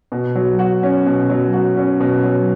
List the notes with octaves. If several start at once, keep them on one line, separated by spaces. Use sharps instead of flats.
B2
F#3
F#4
C#4
B2
F#3
F#4
C#4
B2
F#3